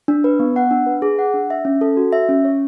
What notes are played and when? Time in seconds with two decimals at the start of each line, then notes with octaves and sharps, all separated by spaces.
0.08 D4
0.24 B4
0.40 B3
0.56 F#5
0.71 D4
0.86 B4
1.02 G#4
1.19 F#5
1.34 D4
1.50 E5
1.65 C#4
1.81 A4
1.97 F#4
2.13 E5
2.29 C#4
2.45 C#5